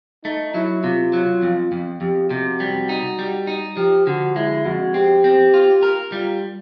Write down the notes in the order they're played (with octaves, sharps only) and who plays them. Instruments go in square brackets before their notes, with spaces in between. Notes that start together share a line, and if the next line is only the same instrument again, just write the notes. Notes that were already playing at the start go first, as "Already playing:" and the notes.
[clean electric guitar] A3 [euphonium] D#4
[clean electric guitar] F#3 [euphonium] E4
[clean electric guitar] C3 [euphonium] F4
[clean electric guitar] F#3
F2
F2
[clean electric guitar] F2 [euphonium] G4
[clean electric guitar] C3 [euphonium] F#4
[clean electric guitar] G3
D#4
G3
D#4
[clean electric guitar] F3 [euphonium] G4
[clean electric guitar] D3 [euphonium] F#4
[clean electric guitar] G#3 [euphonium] E4
[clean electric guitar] F2 [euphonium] F#4
[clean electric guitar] C4 [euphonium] G4
[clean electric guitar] C4
F4
A#4
[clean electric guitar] G3 [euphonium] F4